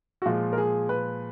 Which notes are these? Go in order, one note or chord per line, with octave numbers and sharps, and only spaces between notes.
F#4
A#2 F3 G#3 F4
A#4
G#4
B4